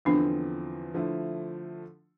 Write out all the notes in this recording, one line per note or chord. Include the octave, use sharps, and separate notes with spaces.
E2 D3 F3 B3 C4 D4
D3 F3 A3 E4